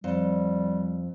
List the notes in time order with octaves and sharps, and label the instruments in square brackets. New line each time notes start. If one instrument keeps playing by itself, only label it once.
[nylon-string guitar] F2 [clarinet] G3